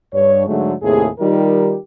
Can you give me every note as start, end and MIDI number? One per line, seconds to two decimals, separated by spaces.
0.13 0.44 43
0.13 0.44 73
0.47 0.73 44
0.47 0.73 50
0.47 0.73 54
0.47 0.73 56
0.47 0.73 57
0.82 1.08 39
0.82 1.08 45
0.82 1.08 48
0.82 1.08 68
1.19 1.76 51
1.19 1.76 55
1.19 1.76 63
1.19 1.76 65
1.19 1.76 67
1.19 1.76 70